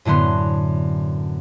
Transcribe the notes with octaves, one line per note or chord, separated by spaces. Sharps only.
F#2 A2 D3 B3 C6